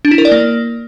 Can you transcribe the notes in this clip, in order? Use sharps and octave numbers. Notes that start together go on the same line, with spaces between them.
D4
E4
A#4
D5
A#3